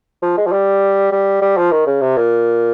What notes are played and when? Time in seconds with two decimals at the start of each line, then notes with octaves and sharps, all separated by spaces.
0.22 F3
0.37 G#3
0.47 F3
0.52 G3
1.12 G3
1.42 G3
1.57 F3
1.72 D#3
1.86 C#3
2.01 C3
2.17 A#2